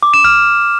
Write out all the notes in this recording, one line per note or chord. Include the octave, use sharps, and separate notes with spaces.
D6
E7
F6